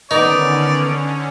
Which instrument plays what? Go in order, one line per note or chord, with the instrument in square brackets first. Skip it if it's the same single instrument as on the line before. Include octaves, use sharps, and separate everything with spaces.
[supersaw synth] D3 C#4 [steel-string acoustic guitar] D#3 B3 [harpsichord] D#4 [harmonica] D5